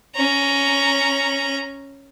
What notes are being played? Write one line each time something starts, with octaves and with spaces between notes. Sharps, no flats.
C#4 A#5